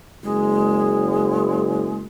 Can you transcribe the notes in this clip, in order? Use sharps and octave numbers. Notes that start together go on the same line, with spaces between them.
F#1 G#3